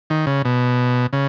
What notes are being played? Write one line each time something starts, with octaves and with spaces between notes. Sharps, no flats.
D#3
C#3
B2
C#3